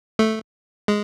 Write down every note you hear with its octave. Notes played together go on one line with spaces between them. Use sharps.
A3
G#3